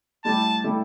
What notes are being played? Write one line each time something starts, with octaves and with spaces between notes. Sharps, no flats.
A2 G3 E4 A4 D5 A5
A2 G3 E4 A4 D5